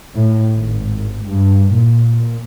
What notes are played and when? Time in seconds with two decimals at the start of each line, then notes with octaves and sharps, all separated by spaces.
0.16 A2
0.56 G#1
1.26 G2
1.72 A#2